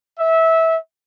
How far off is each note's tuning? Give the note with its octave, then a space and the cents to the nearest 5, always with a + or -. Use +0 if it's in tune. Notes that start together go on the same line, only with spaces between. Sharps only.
E5 -20